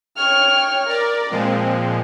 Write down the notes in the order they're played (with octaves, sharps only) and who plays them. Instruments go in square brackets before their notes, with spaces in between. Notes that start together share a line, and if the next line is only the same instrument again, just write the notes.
[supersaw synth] C#5 [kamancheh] G5 F6
[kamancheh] A#4 [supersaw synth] D5
[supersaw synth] A#2 F3 G#3 [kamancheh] C4